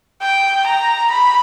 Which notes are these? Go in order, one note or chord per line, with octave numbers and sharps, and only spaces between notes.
G5
A#5
B5